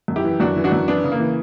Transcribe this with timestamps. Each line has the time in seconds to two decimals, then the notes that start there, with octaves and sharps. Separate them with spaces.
0.08 F#2
0.16 E4 G4
0.24 E3
0.40 F#2 D4 F#4
0.56 E3
0.64 D4 F#4
0.72 F#2
0.88 E3 B3 D4
1.04 C#3
1.12 A#3
1.20 E3